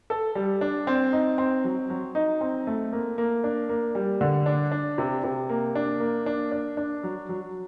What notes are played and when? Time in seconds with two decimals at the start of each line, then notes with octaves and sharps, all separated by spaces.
0.10 A4
0.35 G3
0.61 D4
0.87 C4
1.13 D#4
1.38 C4
1.64 F#3
1.90 F#3
2.15 D#4
2.41 C4
2.67 A3
2.93 A#3
3.18 A#3
3.44 D4
3.69 A#3
3.95 G3
4.21 D3
4.46 D4
4.72 D4
4.98 C3
5.24 C3
5.49 A#3
5.75 D4
6.00 A#3
6.26 D4
6.52 D4
6.77 D4
7.03 F#3
7.29 F#3